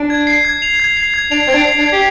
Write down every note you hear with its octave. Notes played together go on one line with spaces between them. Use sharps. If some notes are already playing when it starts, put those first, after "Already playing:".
Already playing: D4
G#6
C7
G#6
F7
G#6
C7
G#6
D4 F7
C4 G#6
D4
C7
D4
G#6
G4